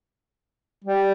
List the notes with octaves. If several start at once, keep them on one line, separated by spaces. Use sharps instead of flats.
G3